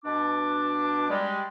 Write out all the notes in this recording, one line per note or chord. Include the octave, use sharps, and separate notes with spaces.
B2 D4 D6
G3 G#3